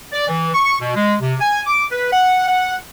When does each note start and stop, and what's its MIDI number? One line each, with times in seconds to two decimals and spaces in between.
0.12 0.23 74
0.28 0.50 52
0.54 0.75 85
0.80 0.93 47
0.95 1.14 56
1.20 1.34 48
1.40 1.60 80
1.67 1.84 86
1.91 2.09 71
2.12 2.45 78
2.47 2.75 78